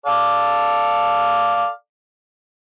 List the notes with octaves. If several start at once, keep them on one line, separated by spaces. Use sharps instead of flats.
A4 D5 F5